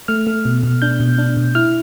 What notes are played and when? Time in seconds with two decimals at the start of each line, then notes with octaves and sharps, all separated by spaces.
0.08 A3 F6
0.27 A3
0.45 B2
0.63 B2
0.82 D4 G6
1.00 B2
1.18 D4
1.37 B2
1.55 E4 F6